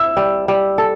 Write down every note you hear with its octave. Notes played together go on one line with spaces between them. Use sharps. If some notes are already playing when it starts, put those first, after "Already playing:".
Already playing: E4 E6
G3
G3
A4